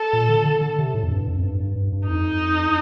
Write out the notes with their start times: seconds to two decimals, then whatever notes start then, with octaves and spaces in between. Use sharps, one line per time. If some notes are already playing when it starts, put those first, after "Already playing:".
Already playing: A4
0.13 A#2
0.29 D3
0.45 D3
0.61 D3
0.79 C3
0.94 A2
1.04 F2
1.11 G2
1.27 F2
1.39 F2
1.43 G2
1.60 G2
1.76 G2
1.92 G2
2.08 F2 D#4